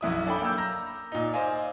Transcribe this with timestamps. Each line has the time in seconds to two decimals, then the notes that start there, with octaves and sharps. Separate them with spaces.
0.01 B1 F#2 E4 D#6
0.26 C#4 D4 A4 G5 B5
0.41 A#3 D6 E6 G6
0.58 A#5 G6 A#6
1.12 A#2 D#4
1.33 C5 D5 D#5 F5 G#5